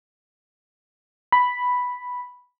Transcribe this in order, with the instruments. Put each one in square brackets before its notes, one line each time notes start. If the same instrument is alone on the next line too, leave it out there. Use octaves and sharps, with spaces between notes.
[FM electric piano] B5